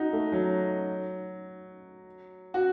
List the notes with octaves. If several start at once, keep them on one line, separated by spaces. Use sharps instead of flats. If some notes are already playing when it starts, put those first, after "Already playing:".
Already playing: D#4 F#4
A3
F#3
F#4